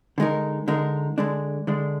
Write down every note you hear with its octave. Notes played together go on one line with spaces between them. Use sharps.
D3 G#3 D#4 A#4
D3 G#3 D#4 A#4
D3 G#3 D4
D3 G#3 D4